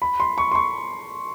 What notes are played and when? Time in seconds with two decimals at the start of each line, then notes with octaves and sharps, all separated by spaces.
0.02 B5
0.20 C6
0.38 C#6
0.51 C6
0.55 C#6